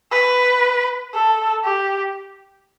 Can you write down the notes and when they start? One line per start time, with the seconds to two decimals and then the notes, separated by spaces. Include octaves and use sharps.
0.12 B4
1.14 A4
1.64 G4